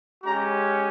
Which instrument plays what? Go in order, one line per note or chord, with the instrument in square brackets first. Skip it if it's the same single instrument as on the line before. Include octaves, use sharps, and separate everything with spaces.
[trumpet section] G#3 C#4 G4 A#5